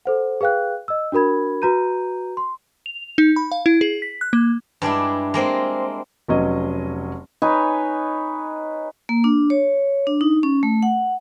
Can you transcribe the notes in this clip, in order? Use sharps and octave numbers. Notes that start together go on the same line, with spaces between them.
A4 C5 F#5
G#4 B4 F5 G5 F#6
D#5 E6
D4 F#4 A#4 B5 G#6
F#4 B4 A#5 G6 D#7
C6
F7
D#4
B5
F5
E4
G#4
B6
F#6
A#3
G2 G#3 D4 E4
G#3 A#3 C4
F1 F#3 C#4 D#5
D#4 B4 C#5 G#5
A#3
D4
C#5
D4
D#4
C#4
A3
F#5